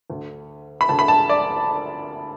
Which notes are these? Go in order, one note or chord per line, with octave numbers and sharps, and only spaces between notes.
D2 D3
B5
D2 D3 A5
B5
A5
D5